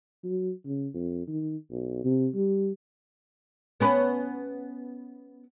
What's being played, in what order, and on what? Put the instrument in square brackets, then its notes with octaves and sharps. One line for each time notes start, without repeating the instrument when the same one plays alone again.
[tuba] F#3
C#3
F2
D#3
B1
C3
G3
[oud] B3 C#4 B4